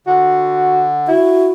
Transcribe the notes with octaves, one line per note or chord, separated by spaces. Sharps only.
D3 F#4
E4 F#4